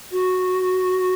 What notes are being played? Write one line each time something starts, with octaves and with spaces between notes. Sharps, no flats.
F#4